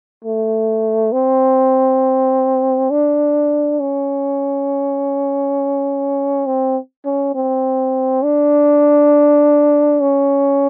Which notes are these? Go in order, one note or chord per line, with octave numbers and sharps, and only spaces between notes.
A3
C4
D4
C#4
C4
C#4
C4
D4
C#4